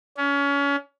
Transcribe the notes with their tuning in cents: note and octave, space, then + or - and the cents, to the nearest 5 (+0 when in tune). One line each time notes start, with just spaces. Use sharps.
C#4 +30